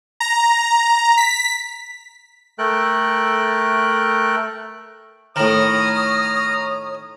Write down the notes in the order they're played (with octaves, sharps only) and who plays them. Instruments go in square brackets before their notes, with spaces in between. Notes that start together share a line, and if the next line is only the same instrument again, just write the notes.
[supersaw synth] A#5
B6
[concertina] A3 A4 A#4 G5 F#6
[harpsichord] A2 D#3 [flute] C#5 [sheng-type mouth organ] A#5 F6 [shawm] D#6